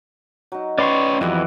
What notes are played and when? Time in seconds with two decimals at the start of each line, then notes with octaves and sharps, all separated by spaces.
0.52 F#3 D#4
0.78 C#4 B4 D5 C6 C#6
1.21 F2 E3 G3 B3 F#4